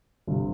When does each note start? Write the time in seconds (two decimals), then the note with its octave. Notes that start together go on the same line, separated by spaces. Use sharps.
0.27 G1 C3